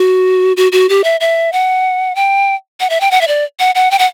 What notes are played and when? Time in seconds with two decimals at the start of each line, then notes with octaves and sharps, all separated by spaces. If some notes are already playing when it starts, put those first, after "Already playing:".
Already playing: F#4
0.57 F#4
0.72 F#4
0.89 G4
1.04 E5
1.20 E5
1.52 F#5
2.15 G5
2.80 F#5
2.90 E5
3.01 G5
3.11 F#5
3.21 E5
3.28 D5
3.60 F#5
3.75 F#5
3.91 G5
3.99 F#5